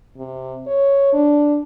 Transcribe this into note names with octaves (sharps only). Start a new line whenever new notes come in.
C3
C#5
D4